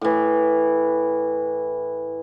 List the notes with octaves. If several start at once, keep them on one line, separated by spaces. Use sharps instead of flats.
A2 E3